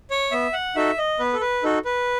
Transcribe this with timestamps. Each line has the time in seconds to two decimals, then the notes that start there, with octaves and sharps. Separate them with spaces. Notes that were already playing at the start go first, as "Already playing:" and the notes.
0.11 C#5
0.31 B3 E5
0.53 F#5
0.76 D#4 F#4 A4 E5
0.98 D#5
1.19 B3 B4
1.33 A4
1.41 B4
1.63 D#4 F#4 A4
1.85 B4